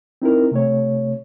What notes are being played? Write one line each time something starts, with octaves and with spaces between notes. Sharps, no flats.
C4 D#4 E4 A#4
C3 A3 C#5